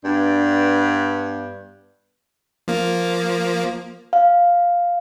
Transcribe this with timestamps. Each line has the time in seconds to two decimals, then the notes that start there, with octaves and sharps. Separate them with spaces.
0.03 G2 B3 D4
2.68 F3 A#3
4.13 F5